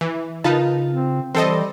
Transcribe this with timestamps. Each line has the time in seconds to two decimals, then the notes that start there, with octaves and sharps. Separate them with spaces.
0.01 E3
0.44 C#3 D#4 F4 A#4 B4 A5
0.89 C4
1.35 E3 G3 C4 A4 C5 D#5